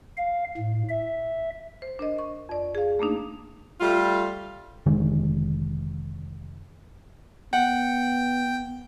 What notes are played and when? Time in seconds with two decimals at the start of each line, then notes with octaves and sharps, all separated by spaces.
0.17 F5
0.57 A2
0.89 E5
1.82 C5
1.99 D4 A#4 D#5
2.19 C#6
2.49 F2 D5
2.75 G#4 F5
2.99 A3 A#3 D4 D#4
3.81 G3 A3 F4
4.86 F1 D3 D#3 G#3
7.53 B3 F#5 G5